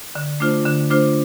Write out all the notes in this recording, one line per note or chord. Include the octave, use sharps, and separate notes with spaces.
D3
A3 D4 F4 C5
D3
A3 D4 F4 C5